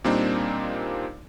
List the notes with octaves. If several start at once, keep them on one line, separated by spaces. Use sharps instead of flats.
A#2 G3 A#3 C4 D4 D#4